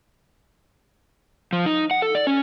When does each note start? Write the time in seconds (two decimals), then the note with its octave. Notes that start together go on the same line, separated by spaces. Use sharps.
1.53 F3
1.66 D#4
1.91 F#5
2.02 A4
2.15 D5
2.27 C#4